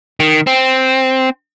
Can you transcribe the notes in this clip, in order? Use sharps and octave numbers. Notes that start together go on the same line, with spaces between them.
D#3
C4